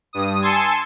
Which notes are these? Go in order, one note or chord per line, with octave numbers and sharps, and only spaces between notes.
G2 D#6
G#5 A5 C6 E6 C#7